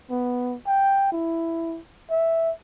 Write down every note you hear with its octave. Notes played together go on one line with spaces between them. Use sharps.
B3
G5
E4
E5